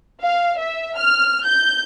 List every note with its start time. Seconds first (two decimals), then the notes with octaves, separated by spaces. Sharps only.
0.22 F5
0.58 E5
0.98 F6
1.45 G6